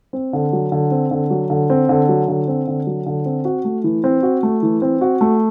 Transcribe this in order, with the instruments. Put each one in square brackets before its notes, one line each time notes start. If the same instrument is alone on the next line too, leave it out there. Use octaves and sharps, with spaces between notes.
[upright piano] C4
D3
F#3
D3
C4
D3
F#3
D3
C4
D3
F#3
D3
C4
D3
F#3
D3
C4
F#4
A3
E3
C4
F#4
A3
E3
C4
F#4
A3